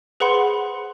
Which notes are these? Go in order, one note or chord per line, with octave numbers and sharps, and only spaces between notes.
G#4 B4 C5 F#5 B5 C6